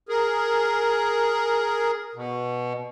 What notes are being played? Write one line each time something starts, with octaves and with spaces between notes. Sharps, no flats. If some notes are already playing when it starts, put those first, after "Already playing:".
G#4 A#4
B2